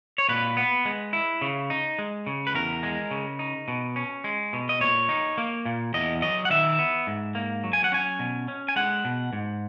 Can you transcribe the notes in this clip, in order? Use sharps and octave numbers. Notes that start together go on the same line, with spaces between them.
C#5
A#2 B4
B3
G#3
E4
C#3
D#4
G#3
C#3
B4
E2 A#4
G#3
C#3
D#4
B2
C#4
G#3
B2
D#5
A#2 C#5
D#4
A#3
A#2
E2 D#5
F#3 D#5
F#5
D#3 E5
B3
G#2
A#3
F#3
G#5
F#5
C#4 G#5
B2
C#4
G#5
G#3 F#5
B2
G#2